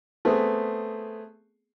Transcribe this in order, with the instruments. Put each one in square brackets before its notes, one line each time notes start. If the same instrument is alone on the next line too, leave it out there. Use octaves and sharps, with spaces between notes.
[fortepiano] A3 B3 C4 G#4